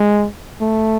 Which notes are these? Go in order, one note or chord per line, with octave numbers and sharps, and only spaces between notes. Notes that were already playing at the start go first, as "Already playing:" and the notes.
Already playing: G#3
A3